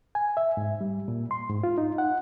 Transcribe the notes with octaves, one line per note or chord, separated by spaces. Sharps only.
G#5
E5
G#2
G3
A#2
C6
G#2
F4
D#4
F#5